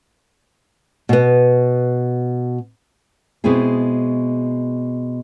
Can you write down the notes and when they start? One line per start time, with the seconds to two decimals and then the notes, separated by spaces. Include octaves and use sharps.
1.09 B2 B3
3.44 B2 G#3 B3 C4 E4 G#4